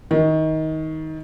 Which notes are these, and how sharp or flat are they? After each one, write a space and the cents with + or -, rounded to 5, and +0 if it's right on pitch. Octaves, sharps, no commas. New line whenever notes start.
D#3 +20